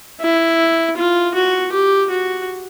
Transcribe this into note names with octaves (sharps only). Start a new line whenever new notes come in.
E4
F4
F#4
G4
F#4